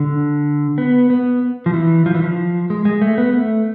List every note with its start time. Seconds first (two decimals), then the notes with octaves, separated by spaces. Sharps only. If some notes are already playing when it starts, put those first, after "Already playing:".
Already playing: D3
0.78 B3
1.10 B3
1.66 F3
1.74 E3
2.06 F3
2.15 E3
2.23 F3
2.70 G#3
2.85 G#3
3.01 A3
3.18 B3
3.33 A3